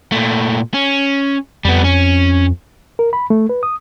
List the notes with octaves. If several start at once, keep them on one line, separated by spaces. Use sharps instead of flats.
A#2 A3
C#4
F2 G3 B3
C#4
A#4
B5
A3
B4
D#6